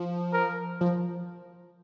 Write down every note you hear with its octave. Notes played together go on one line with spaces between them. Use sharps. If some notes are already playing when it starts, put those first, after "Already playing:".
Already playing: F3
A#4
F3